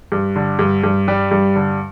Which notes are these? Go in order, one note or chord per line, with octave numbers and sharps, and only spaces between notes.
G2
D3
G2
G2
G3
G2
D3